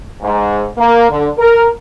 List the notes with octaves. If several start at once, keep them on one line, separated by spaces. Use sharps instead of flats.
G#2
A#3
D3
A#4